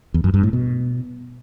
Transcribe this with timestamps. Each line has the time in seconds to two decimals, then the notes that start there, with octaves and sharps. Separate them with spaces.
0.14 E2
0.24 F#2
0.34 G2
0.43 A2
0.53 B2